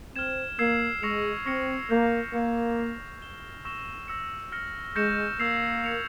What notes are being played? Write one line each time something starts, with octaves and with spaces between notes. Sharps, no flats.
C4 F6 G#6 E7
A#3 E6 G#6 C7 E7
G#3 C#6 E6 A#6 C#7 F7
C4 C#6 F6 A#6 C#7
A#3 E6 G6 C7 F7
A#3 C#6 E6 G#6 C#7
G6 C7 F7
G#6 E7 G7
C#6 E6 A#6 E7 G7
E6 A#6 C#7
F6 A#6 C#7
G#3 C#6 G6 A#6 C#7 E7
A#3 E6 G#6 C7 F7
G#6 C#7 F7